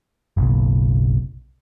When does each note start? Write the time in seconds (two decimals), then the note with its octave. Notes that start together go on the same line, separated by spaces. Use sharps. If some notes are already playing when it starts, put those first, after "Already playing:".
0.37 F#1 B1